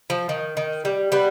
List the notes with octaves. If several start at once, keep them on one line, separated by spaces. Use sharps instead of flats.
F3
D#3
D#3
G3
G3 B3